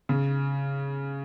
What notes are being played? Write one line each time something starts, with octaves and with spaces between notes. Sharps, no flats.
C#3